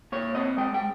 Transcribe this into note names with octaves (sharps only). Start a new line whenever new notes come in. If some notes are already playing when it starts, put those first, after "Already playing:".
A#2 C#5
C4 D#5
G#3 G5
G5